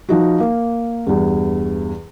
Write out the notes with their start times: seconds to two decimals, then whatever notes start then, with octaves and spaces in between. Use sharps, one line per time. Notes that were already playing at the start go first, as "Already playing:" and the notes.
0.09 F3 D#4 F#4
0.40 A#3
1.07 E2 G2